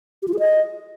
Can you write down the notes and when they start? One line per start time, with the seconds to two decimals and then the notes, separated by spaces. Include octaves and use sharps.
0.22 G4
0.28 F4
0.34 G#4
0.39 D#5